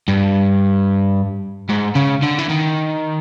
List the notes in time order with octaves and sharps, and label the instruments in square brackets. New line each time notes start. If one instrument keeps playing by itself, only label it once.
[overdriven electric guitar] G2
G#2
C#3
D3
E3
D#3